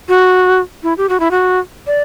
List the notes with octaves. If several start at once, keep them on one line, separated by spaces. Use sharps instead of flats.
F#4
E4
G4
F#4
E4
F#4
D5